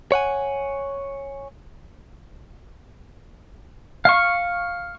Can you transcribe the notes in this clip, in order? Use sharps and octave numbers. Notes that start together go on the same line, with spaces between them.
C#5 F#5 G#5
F5 C#6